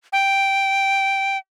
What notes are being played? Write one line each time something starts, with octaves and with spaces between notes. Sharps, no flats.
G5